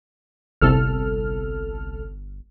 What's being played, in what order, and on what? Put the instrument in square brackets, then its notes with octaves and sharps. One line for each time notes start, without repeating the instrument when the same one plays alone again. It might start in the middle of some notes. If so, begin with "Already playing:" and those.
[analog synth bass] G1 [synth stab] C2 A4 F6